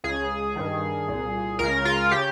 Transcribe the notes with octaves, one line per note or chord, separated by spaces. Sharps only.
C#2 C#3 G#4
G2 D#3
C2 A#2
C#2 C#3 A#4
F4
C#3 G4